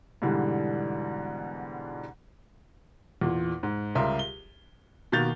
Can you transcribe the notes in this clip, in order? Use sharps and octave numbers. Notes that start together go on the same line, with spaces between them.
G#2 B2 D3 E3 G3
E2 A#2
G#2
C#2 G3 G4 A#4 E5 C6
G7
B2 D#3 A#3 G6 A6 F7